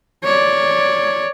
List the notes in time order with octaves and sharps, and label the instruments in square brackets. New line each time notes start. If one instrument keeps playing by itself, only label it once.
[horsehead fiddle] C#5 D5